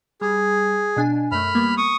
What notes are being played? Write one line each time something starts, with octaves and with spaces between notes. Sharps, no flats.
G3 G#4
B2 D4 G#5
F#2 A3 B5 F6
G3 A#3 B3
C#6 D#6